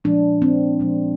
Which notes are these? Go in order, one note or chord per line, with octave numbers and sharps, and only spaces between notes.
A#2 F3 G#3 D4
C4
A#2 F3 G#3